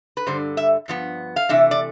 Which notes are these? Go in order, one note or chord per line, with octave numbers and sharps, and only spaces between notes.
B4
G2 D3 G3 C5
E5
G2 F3 B3
F5
C3 E3 A3 D4 E5
D5